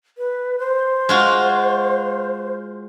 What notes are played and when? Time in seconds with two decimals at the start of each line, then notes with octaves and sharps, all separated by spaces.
0.18 B4
0.59 C5
1.09 G#3 F4 F#4